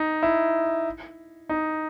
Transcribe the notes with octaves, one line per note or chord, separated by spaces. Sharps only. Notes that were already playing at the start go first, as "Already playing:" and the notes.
Already playing: D#4
E4
D#4